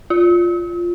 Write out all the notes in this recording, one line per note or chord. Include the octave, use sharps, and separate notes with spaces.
F4